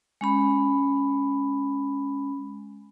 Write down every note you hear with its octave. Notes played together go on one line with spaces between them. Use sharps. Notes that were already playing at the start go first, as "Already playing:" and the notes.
G#3 C#4 B5